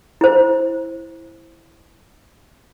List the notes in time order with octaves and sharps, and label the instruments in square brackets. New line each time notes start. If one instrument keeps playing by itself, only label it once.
[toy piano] E4 C5